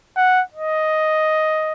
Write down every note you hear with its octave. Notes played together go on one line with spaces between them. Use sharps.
F#5
D#5